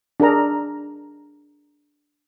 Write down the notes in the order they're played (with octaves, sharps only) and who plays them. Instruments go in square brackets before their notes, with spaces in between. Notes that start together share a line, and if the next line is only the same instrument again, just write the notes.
[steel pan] D4 G#4 A#4 A#5